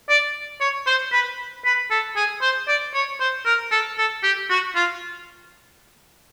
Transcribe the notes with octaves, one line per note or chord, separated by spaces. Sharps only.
D5
C#5
C5
B4
B4
A4
G#4
C5
D5
C#5
C5
A#4
A4
A4
G4
F#4
F4